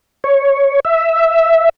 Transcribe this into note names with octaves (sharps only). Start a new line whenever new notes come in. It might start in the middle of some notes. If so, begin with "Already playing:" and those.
C#5
E5